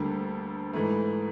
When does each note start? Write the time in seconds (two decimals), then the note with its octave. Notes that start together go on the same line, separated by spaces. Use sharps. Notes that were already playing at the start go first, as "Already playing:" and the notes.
Already playing: D2 D3 G3 A#3
0.73 G#2 E3 A3